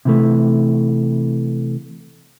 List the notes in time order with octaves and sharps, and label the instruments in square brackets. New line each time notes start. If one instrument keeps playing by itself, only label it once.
[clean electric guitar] C3 E3 A3